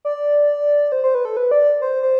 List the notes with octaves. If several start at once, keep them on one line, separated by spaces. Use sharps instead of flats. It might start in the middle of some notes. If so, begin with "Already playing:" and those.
D5
C5
C5
B4
A4
B4
D5
C5
C5